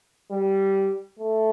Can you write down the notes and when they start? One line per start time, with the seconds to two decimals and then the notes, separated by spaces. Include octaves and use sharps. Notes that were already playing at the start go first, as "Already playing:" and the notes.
0.31 G3
1.19 A3